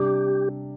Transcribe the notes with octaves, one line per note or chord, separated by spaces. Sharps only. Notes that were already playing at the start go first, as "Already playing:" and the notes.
Already playing: C3 G3 D4 G4